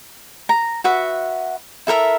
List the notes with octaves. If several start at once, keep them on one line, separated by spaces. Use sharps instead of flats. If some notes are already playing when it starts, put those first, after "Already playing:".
A#5
F#4 B4 E5 F#5
E4 A4 A#4 E5